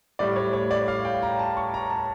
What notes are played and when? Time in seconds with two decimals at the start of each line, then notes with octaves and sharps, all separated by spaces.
0.19 A2 G3 D5
0.36 C#5
0.53 C#5
0.71 D5
0.88 F5
1.05 G5
1.23 A#5
1.39 A5
1.57 C#6
1.74 A#5
1.90 A5